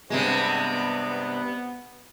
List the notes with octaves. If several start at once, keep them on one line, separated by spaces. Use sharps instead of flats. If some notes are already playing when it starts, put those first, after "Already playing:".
G2 C3 G#3 B3